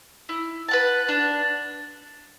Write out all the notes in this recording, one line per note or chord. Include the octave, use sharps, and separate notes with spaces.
E4
B4 F#5 A5
D4